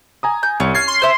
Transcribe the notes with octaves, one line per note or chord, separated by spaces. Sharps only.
G#5 A#5 D#6
G6
C2 C#4
F6 G#6 A6 C7
C6
C5 E5